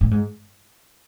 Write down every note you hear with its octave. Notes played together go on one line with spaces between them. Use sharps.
A2
G#2